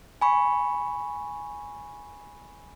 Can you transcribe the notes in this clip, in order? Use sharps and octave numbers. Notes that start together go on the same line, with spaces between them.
G#5 B5 C#6